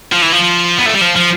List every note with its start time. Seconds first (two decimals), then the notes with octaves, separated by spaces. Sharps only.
0.12 F3
0.22 E3
0.32 F3
0.78 B3
0.86 A3
0.94 G3
1.01 F3
1.16 F3